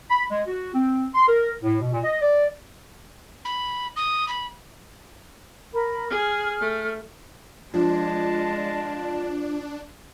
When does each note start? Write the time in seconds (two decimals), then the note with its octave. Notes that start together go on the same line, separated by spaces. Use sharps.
0.10 B5
0.30 G#3
0.48 F#4
0.74 C4
1.14 C6
1.27 A#4
1.63 A2
1.81 B2
1.93 A#2
2.04 D#5
2.22 D5
3.45 B5
3.96 D#6
4.28 B5
5.73 A#4 B5
6.10 G#4 F6
6.61 A3
7.74 F3 G#3 D4 F4 A5